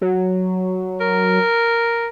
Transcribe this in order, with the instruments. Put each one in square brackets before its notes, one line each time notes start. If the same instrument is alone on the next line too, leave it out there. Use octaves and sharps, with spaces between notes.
[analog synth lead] F#3
[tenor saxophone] A#4